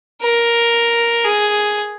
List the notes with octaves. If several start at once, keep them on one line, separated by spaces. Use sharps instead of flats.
A#4
G#4